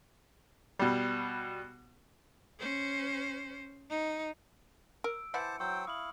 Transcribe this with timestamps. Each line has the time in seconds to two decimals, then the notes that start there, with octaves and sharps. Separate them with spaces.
0.79 B2 G3
2.59 C#4 C5
3.90 D#4
5.04 A#4 E6 D7
5.34 E3 E4 C5 F#5 A5 D6 C#7
5.60 F#3 C5 G5 C#6 E6
5.87 E4 F5 D#6 F#7